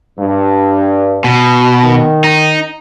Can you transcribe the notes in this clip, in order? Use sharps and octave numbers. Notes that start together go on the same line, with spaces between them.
G2
B2
D#3
D#4